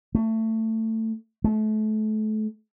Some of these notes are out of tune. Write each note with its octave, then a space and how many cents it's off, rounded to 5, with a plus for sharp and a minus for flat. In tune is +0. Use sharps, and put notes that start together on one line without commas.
A3 +20
A3 -30